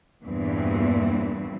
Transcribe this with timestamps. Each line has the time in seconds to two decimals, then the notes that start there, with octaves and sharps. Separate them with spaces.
0.24 E2 G2 A#2 E3 C4